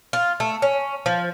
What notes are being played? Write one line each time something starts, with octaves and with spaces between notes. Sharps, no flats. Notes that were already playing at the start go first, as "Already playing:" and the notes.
F4
A3
C#4
F3